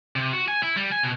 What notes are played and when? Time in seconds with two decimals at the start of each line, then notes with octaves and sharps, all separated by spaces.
0.16 C3
0.33 F#4
0.48 G#5
0.63 E4
0.76 G3
0.92 G#5
1.03 B2